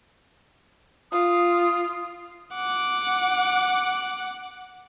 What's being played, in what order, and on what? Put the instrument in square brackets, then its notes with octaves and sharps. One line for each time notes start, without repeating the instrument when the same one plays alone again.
[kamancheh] F4 [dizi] D#6
[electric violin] F#5 D6